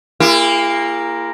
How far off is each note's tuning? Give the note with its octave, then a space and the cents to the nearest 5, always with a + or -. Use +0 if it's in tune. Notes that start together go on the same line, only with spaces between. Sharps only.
A#3 +0 E4 +35 G#4 -40